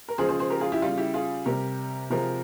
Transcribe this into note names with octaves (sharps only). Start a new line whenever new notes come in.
A#4
C#3 F3 G#3 G#4 C5
G#4 C5
G#4 C5
G4 A#4
F4 G#4
E4 G4
C#3 G3 F4
E4 G4
F4 G#4
C3 G3 G4 A#4
C3 F3 G#3 G4 A#4